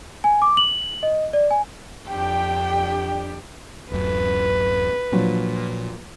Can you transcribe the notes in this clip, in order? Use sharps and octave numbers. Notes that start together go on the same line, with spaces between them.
G#5
D6
F#7
D#5
D5
G#5
F2 D4 G4 G5
D1 F#2 B4
A#2 F3 F#3 D4